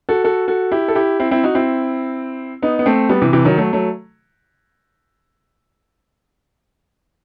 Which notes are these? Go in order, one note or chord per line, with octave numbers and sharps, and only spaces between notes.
F#4 A4
F#4 A4
F#4 A4
E4 G4
A4
E4 G4
C4 E4
C4 E4
D#4 F#4
C4 E4
B3 D#4
B3
A3 C4
G3 B3
C3 E3
C3 E3
D#3 F#3
F#3 A3
F#3 A3